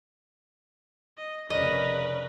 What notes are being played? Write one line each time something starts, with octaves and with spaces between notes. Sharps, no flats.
D#5
F1 C#3 C#4 A#4 B4 D5 D#5